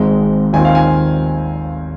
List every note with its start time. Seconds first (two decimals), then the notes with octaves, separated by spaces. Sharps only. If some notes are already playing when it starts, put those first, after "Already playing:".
Already playing: G#1 G#2 G#3 C4
0.53 D#2 D#3 C4 F4 G#5
0.65 F5
0.75 G#5